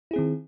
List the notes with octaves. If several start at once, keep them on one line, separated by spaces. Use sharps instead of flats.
D#3 C4 E4 G#4